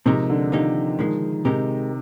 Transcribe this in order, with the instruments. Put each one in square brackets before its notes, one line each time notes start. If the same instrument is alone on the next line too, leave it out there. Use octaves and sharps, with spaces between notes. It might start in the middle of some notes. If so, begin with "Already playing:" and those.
[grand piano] C3 [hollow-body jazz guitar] F3 G#3 D#4 A#4
[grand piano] D3
[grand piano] D#3 [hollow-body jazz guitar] F3 A#3 D#4 G4
[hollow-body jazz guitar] D3 F3 G#3 [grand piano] D#3
[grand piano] C3 [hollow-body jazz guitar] G#3 D#4 G4 A#4